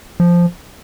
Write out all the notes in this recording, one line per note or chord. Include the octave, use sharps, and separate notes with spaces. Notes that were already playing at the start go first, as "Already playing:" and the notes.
F3